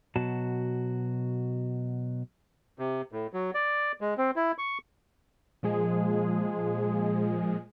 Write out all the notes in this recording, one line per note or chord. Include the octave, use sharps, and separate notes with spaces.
B2 F#3 F#4 A5
C3
A2
F#3
D5
G#3
C4
E4
C#6
A#2 F3 G#3 G#4